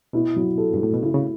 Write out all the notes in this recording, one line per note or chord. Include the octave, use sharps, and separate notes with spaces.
B2 E4
F#3
A4
G2
A2 A3
B2
C#3 E4
C#3